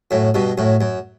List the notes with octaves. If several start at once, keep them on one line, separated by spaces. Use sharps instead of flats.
F#2 A2
G2 B2
F#2 A2
F#2